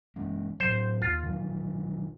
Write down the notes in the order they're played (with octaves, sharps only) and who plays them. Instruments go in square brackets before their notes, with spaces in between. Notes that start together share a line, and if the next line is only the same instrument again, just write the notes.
[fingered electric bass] E3 G#3 C#4
[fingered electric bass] A2 F#3 [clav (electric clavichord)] C5
[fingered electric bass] D#2 [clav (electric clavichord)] F4
[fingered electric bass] D3 D#3 F#3